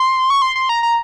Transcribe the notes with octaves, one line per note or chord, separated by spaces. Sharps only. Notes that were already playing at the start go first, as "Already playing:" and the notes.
Already playing: C6
C#6
C6
C6
A#5
A#5